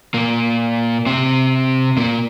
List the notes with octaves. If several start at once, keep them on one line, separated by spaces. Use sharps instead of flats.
A#2 A#3
C3 C4
A#2 A#3